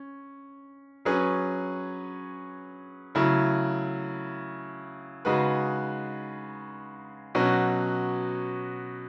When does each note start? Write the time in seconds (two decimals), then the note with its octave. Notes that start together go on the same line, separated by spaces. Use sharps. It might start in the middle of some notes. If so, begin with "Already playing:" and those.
Already playing: C#4
1.05 F#3 C#4 G#4 B4
3.15 C#3 F#3 A3 E4
5.25 C#3 G#3 D#4 F#4 B4
7.35 B2 F#3 C#4 F#4